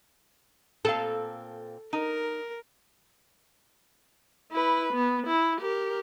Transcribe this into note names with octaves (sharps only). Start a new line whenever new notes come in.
A#2 C4 A4 F5
D#4 A#4
E4 B4
B3
E4
G4 A#4